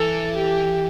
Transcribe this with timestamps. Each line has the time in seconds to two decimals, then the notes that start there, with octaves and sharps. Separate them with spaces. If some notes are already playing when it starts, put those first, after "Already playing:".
Already playing: E3 A4
0.36 G4